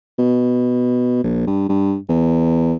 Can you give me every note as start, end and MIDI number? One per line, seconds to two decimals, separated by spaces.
0.19 1.23 47
1.24 1.44 34
1.47 1.69 43
1.69 1.96 43
2.09 2.75 40